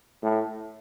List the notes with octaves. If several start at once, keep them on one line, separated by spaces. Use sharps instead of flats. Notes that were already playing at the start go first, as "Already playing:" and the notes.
A2